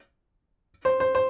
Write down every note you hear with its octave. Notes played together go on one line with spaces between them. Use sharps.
C5
C5
C5